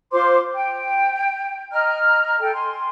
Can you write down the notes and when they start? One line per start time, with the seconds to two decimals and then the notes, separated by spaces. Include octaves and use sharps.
0.12 F4 C5 C6 D6
0.54 G5
1.71 D#5 A#5 F6
2.40 A4 G5
2.53 G#5 C6